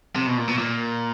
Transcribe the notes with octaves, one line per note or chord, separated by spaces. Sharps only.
C3
B2
A#2
B2
A#2